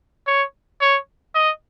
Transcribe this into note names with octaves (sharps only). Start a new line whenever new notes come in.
C#5
C#5
D#5